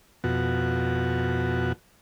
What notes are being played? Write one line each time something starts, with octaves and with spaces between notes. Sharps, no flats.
F2 B2 F#4